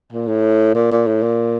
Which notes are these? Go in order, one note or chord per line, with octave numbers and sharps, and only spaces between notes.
A#2
A2
A#2
A#2
A2
A#2